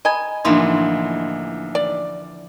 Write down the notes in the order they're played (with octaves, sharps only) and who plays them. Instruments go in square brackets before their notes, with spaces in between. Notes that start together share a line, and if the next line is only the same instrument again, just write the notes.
[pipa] D#5 G#5 [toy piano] A#5 B5
[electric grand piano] A1 A#3 D#4 [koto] D3 E3 F3 [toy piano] D4 C6
[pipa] D5